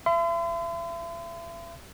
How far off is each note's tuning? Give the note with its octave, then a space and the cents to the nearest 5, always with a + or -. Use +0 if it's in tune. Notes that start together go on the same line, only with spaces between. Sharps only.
E5 +40 C6 -45